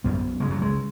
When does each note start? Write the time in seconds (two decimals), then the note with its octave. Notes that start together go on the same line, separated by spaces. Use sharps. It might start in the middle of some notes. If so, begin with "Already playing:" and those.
0.04 F#2 B3
0.40 C#3 G#3
0.51 F#3
0.62 G#3